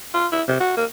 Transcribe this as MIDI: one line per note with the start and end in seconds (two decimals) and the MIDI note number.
0.14 0.27 65
0.32 0.43 64
0.48 0.57 48
0.60 0.76 66
0.77 0.85 58